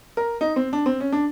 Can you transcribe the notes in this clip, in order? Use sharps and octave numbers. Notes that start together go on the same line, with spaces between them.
A#4
D#4
C4
D4
C4
C#4
D4